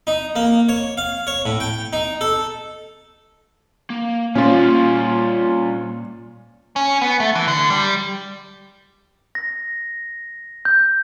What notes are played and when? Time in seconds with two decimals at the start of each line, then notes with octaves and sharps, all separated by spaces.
0.07 D#4
0.36 A#3
0.69 C#5
0.97 F5
1.27 C#5
1.46 A2
1.60 G5
1.93 D#4
2.21 A4
3.90 A#3
4.35 A#2 G3 C#4 F4 C5 F5
6.76 C#4
7.02 B3
7.20 A3
7.35 E3
7.48 D3
7.70 G3
9.35 A#6
10.65 G6